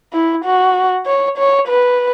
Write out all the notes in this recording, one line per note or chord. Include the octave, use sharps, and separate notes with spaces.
E4
F#4
C#5
C#5
B4